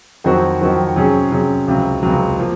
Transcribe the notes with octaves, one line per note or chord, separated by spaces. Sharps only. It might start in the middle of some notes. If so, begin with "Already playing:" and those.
F2 D#3 F#3 C4 F#4
F2 D#3 F#3 C4 F#4
C3 F#3 C#4 G#4
C3 F#3 C#4 G#4
C#2 C3 F#3
C#2 C3 F#3
F3 A#3